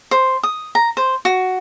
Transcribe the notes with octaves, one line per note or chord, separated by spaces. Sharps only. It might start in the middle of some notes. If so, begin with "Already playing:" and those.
C5
D#6
A#5
C5
F#4